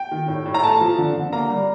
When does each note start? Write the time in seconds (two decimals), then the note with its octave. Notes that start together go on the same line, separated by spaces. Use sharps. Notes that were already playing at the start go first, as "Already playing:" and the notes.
Already playing: G5
0.11 D#3
0.28 A2
0.46 A2
0.54 A#5
0.62 A3 A5
0.81 F3
0.98 D3
1.15 D3
1.33 A#3 A#5
1.50 G3